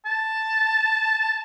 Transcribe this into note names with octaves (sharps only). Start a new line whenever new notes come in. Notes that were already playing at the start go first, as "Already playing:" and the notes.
A5